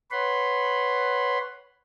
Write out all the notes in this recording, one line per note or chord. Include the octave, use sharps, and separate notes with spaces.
B4 C#5 F#5 B5 C6